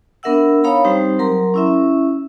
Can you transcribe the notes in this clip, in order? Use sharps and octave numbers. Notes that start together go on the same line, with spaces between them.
B3 D4 A#4 E5 F#5 E6
D#4 C#5 F5 A#5 B5
G3 C4 D#4 G4 C5
F#3 A#4 A#5 C6
C#4 E4 E5